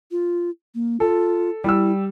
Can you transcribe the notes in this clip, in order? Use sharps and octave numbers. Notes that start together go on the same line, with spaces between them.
F4
A#3
F4 A4
G3 E4 E6